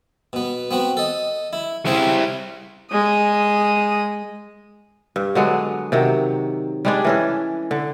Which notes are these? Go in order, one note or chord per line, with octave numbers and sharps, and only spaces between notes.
B2 B3
B3 C4 F#4
A4 D#5
E4
C#3 G3 C4 E4 G#4
G#3 D#6
G2
D3 F#3 G#3 B3
C3 D#3 F#3
G3 G#3 D4
E3 C#4 A4
D3